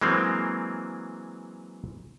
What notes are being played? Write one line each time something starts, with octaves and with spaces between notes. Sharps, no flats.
E3 F#3 G#3 A#3 C4